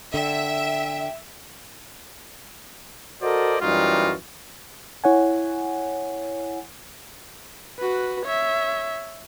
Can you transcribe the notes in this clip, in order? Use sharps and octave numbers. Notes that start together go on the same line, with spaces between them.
D3 E5 G5
F#4 A4 A#4 C5 D5 D#5
F#2 E3 G3 D#4 F4 F#4
E4 C#5 F#5 G#5
F#4 B4
C#5 E5